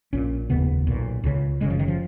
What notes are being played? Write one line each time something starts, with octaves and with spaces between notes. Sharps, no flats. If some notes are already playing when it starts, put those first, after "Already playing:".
A#1 A#2 C#4
F1 D#2 C#3 B3
B1 A#2
C#2 C#3
F#1 F#2 C#3 G#3
F3
D#3
F3